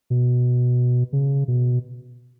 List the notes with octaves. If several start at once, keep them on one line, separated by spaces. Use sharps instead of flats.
B2
C#3
B2